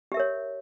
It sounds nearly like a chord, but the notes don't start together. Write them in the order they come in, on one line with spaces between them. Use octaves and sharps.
G4 E5 A#4 C#5